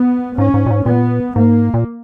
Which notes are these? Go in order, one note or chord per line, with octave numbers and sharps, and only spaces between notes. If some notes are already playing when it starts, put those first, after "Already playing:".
Already playing: B3
G#2 C#4
G#2
A#2
G#2
A#2 B3
G#2 A#3
A#2